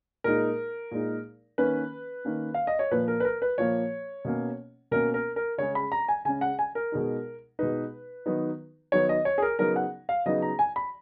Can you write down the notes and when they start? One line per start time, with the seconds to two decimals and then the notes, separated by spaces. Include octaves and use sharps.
0.24 A#2 G#3 D#4 A#4
0.91 A#2 G#3 D#4
1.58 D#3 A#3 C#4 B4
2.25 D#3 A#3 C#4
2.54 F5
2.67 D#5
2.79 C#5
2.91 A#2 F3 A#3 B4
3.08 A#4
3.20 B4
3.25 A#4
3.42 B4
3.58 A#2 F3 A#3 C#5
4.25 B2 A#3 C#4
4.91 B2 A#3 C#4 A#4
5.14 A#4
5.36 A#4
5.58 C#3 G#3 C#4 C#5
5.75 B5
5.92 A#5
6.08 G#5
6.25 C#3 G#3 C#4 G#5
6.41 F#5
6.59 G#5
6.75 A#4
6.92 B2 G#3 D#4
7.59 B2 G#3 D#4 B4
8.26 D#3 F#3 B3 D#4
8.92 D#3 F#3 B3 D#4 C#5
9.09 D#5
9.25 C#5
9.38 G#4
9.42 A#4
9.59 C#3 F#3 B3 D#4 A#4
9.76 F#5
10.09 F5
10.26 C#3 F#3 B3 D#4 D#5
10.42 A#5
10.59 G#5
10.76 B5